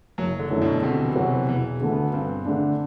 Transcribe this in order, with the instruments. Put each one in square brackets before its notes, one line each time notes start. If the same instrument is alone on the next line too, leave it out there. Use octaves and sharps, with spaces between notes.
[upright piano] F#1 [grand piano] F#3
[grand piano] D3
[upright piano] F#2 E3 A3 D4
[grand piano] B2
[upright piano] D2 [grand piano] C3
[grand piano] E3
[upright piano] C3 F#3 C4 F#4
[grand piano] E3
[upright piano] E1 [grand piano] E3
[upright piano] D2 D3 A3
[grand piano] B3
[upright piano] G2 [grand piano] C4
[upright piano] D3 A3 D4